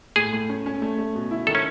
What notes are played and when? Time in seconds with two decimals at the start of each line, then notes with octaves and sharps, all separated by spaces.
0.16 A2 G#4
0.33 A2
0.49 C#4
0.66 C#4
0.82 A3
0.98 A3
1.15 B2
1.31 E4
1.47 D#3 A4
1.55 C#4